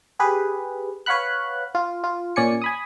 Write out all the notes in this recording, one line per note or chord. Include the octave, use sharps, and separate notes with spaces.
G4 G#4 B4
B4 C#5 F5 F#5 B5 F#6
F4
F4
A#2 C#4 D5 G#5 C#7
G#5 B5 D#6